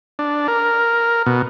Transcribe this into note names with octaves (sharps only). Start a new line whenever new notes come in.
D4
A#4
B2